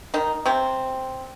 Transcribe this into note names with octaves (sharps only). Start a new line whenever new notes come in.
D#3 D#4
C3 C4